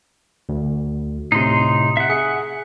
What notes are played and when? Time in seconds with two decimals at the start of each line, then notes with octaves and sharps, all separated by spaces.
0.49 D2
1.32 A2 C3 D#4 C6
1.97 E5 F#5
2.10 G#4 C#7